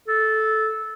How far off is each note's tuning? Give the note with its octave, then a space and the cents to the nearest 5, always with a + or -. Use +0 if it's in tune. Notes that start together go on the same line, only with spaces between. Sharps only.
A4 -10